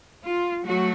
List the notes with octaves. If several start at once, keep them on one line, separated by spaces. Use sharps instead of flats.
F4
F#3 A3 F#4